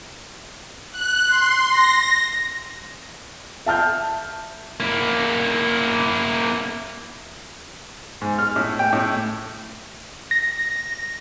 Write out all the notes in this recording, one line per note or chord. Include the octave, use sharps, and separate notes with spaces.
F#6
C6
A#6
E5 A5 F6 G6
A#3 E4
G#2
F6
A2
G5
A2
A#6